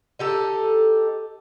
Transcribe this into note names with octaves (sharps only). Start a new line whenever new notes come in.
D#4 G4 A4